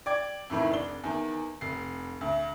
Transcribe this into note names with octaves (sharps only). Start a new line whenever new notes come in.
D5 G5 D6 G#6
F2 A2 D#3 E3
F1 D4 G7
E2 D#3
F1 C7
D2